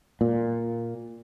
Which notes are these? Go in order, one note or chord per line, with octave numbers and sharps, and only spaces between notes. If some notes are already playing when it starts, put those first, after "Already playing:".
A#2